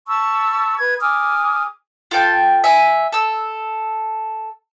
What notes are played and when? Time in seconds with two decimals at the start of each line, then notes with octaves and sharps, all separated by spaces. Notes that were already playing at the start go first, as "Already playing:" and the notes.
0.08 A5 B5 C#6 E6
0.79 B4 G#6
1.01 G#5 D6 D#6 F6
2.11 F4 A4 G5 A5
2.64 E5 G#5
3.12 A4 E6